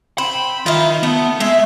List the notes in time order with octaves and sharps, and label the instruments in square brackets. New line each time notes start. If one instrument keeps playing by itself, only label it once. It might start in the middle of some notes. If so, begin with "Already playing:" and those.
[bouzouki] C4 [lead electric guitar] B5
[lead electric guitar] D#3 [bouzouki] E4 F4
[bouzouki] A3 [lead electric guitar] B3
[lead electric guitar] G#3 [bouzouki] E5